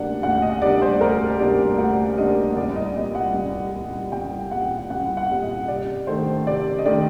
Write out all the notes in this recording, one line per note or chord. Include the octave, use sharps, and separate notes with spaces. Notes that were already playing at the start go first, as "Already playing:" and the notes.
Already playing: D2 C3 G3 A#3 D4 F#5
D2 F#5
D#5
C3 G3 A#3 D4 D5
C5
D2 A#4
C3 G3 A#3 D4 D5
D2 F#5
C3 G3 A#3 D4 D#5
C2 D5
D#5
A#2 G3 D#5
F#5
C2
A#2 G3
C2 G5
A#2 G3 F#5
C2 F#5
F#5
A#2 G3
D#5
C3 D5
D#3 A3 D4 C5
C3 D5
D#5
D#3 A3 D4 D5